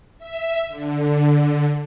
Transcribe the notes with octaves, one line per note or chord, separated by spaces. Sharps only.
E5
D3